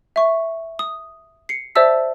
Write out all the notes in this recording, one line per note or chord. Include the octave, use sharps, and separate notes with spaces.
E5 C#6
D#6
C7 C#7
C5 D5 E5 A5 E6 B6